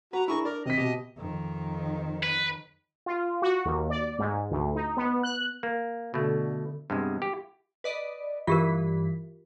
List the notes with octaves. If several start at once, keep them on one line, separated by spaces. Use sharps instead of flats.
F#4 B4 A#5
D4 E4 G#4 A#4 C#6
A#4 D5
C3 D#5 B6
B2 G4
F2 D#3
B4
F4
F#4
D#2
D5
G#2
D2
D#4
B3
F#6
A#3
B2 D3 A3
G2 C3 G#3 B3
G4
B4 D5 D#5
G2 E3 F4 G4 A#4 B6